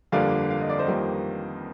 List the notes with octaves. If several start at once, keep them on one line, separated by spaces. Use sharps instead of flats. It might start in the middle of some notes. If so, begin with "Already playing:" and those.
G1 F2 D3 G3 A#3 D5 F5
F5
D#5
D5
C5 D#5
G1 F2 D#3 G3 A#3